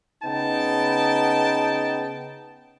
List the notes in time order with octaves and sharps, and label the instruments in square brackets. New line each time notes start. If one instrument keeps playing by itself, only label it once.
[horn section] C#3 B3 D#4 G5 A5